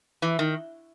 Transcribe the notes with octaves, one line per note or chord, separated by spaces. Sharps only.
E3
D#3